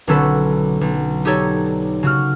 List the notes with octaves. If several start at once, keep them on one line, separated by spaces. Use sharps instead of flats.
B1 D3 C#4 F#4 A4 B4
B1
D#4 G4 A4 C#5 D5
C#3 F#4 F6